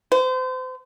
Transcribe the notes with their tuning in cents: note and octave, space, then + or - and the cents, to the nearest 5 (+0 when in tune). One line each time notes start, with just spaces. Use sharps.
C5 -35